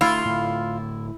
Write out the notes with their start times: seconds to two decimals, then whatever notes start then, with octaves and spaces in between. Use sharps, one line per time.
0.01 D2 A3 E4 F4
0.25 A2 D3